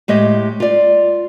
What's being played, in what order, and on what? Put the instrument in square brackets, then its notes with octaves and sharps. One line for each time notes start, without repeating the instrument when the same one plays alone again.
[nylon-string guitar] A2 G#3 G4 D#5
F4 D5